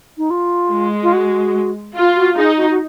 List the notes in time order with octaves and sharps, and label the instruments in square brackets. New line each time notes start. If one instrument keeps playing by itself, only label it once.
[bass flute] D#4
F4
[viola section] G#3
[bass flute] F4
F#4
[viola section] F4
[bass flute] F#4
[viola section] D#4 [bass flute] G#4
[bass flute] F#4
F#4